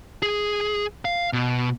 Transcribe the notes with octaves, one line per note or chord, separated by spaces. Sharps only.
G#4
F5
B2